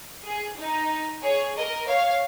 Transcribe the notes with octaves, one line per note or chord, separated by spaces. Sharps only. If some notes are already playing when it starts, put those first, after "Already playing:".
G#4
D#4
G#4 C#5
A#4 D#5
C#5 F5